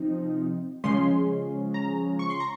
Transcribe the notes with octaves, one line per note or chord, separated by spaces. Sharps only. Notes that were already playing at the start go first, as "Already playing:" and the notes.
Already playing: C3 F3 C4 D#4
C#3 F3 G#3 C#4 C6
A#5
C#6
C6
A#5